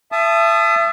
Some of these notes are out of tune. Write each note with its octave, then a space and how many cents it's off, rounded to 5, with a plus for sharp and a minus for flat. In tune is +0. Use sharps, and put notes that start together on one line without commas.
E5 +30 A5 -15 D#6 -15